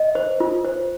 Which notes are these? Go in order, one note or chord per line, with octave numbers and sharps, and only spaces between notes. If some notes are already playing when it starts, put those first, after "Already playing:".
Already playing: D#5
C5
F4
C5